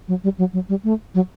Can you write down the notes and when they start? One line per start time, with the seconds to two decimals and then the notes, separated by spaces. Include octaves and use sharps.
0.08 F#3
0.24 G3
0.38 F#3
0.53 F#3
0.69 G3
0.84 A3
1.15 F#3